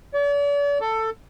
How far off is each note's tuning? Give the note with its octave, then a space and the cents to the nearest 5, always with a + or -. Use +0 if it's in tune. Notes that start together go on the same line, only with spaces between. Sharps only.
D5 -45
A4 +15